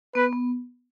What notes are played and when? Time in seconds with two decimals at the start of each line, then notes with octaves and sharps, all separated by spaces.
0.15 B3 B4
0.32 B3